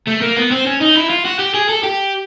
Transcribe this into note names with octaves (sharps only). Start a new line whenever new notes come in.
A3
A#3
B3
C4
C#4
D#4
E4
F4
F#4
G4
G#4
A4
G4